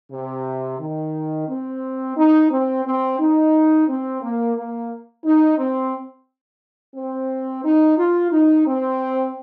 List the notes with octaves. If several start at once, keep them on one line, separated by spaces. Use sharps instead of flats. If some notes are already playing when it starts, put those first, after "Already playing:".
C3
D#3
C4
D#4
C4
C4
D#4
C4
A#3
A#3
D#4
C4
C4
D#4
F4
D#4
C4